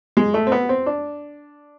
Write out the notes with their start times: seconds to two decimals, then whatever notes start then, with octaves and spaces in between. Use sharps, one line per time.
0.17 G#3
0.34 A3
0.47 C4
0.52 B3
0.69 C4
0.86 D4